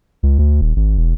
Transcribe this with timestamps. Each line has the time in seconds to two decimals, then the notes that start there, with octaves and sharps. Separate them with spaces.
0.23 C#2
0.39 D2
0.61 D#1
0.76 G#1
0.97 E1